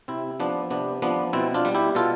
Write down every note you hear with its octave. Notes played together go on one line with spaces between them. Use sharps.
C3 C4 E4
F3 B3 D4
C3 B3 D4
F3 B3 D4
B2 C4 E4
D4 F4
G3
E4 G4
B2 F4 A4